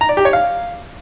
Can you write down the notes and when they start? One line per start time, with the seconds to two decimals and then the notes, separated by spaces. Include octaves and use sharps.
0.01 A#5
0.09 D5
0.17 G4
0.25 C#5
0.33 F5